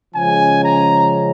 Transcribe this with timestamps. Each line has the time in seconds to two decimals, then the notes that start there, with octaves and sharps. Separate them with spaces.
0.14 C#3 F3 G#3 C#4 G#5
0.62 A#5